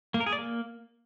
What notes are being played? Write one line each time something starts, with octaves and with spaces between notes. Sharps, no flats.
A#3
A#4
G#4
D5
A#3